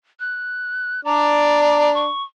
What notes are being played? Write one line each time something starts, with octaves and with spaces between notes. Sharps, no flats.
F#6
D4 D5 A#5
C#6